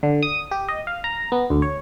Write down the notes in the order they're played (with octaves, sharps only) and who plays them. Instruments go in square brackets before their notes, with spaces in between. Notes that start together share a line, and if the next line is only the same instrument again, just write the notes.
[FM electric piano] D3
D#6
G4
D#5
F5
A#5
B3
D2
C#5